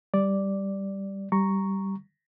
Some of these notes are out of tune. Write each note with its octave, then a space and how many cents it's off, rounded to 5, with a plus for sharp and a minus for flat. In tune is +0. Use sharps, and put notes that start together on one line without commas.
G3 +0 D5 +0
G3 -10 A#5 +0 C#6 +0